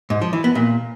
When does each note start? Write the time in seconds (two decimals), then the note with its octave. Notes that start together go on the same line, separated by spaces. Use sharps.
0.10 G#2
0.21 F3
0.33 E3
0.44 B3
0.55 A#2